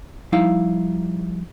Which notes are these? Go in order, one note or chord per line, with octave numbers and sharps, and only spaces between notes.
F3 G3 D#4 E4 F5